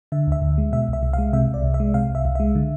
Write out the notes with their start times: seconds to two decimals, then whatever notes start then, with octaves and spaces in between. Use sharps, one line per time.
0.12 D3 E5
0.27 D2 E5
0.42 D2
0.58 G#3
0.72 B2 E5
0.88 C2
0.93 E5
1.03 C2
1.13 F5
1.18 G#3
1.33 C3 E5
1.49 C2
1.54 D5
1.64 C2
1.74 E5
1.80 G#3
1.94 C3 F5
2.09 C2
2.15 E5
2.25 C2
2.35 G#3 E5
2.55 D3